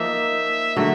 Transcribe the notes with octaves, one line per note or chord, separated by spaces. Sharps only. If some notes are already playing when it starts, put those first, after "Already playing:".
Already playing: F3 A#3 D#4 E5
D3 F#3 A3